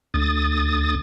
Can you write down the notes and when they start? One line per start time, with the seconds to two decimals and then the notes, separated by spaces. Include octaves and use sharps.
0.14 D2 D#6 A6